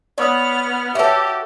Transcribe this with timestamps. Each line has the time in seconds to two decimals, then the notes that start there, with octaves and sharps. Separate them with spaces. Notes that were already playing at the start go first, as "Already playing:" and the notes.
0.18 B3 C#5 D5 D#6 F6
0.95 F#4 G4 A4 B4 C#5 E5